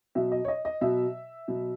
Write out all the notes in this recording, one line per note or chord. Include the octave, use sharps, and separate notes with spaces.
B2 F#3 E5
D#5
C#5
D#5
D#5
B2 F#3 E5
B2 F#3